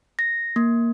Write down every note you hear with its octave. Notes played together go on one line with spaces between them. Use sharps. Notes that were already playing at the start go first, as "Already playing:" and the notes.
A#6
A#3